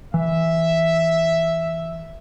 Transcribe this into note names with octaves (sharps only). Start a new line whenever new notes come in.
E3 E5